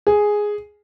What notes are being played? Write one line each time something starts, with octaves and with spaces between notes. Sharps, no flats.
G#4